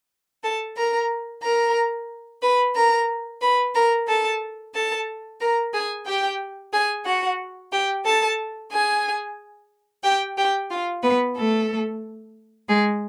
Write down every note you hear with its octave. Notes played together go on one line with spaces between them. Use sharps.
A4 A5
A#4 A#5
A#4 A#5
B4 B5
A#4 A#5
B4 B5
A#4 A#5
A4 A5
A4 A5
A#4 A#5
G#4 G#5
G4 G5
G#4 G#5
F#4 F#5
G4 G5
A4 A5
G#4 G#5
G4 G5
G4 G5
F4 F5
B3 B4
A3 A4
G#3 G#4